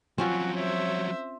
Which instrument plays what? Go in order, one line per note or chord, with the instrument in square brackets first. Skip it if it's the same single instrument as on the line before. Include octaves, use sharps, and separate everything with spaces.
[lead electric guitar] F3 F#3 [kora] C4 C#4 F4 [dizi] F#4
[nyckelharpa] C5 E5 [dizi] C#5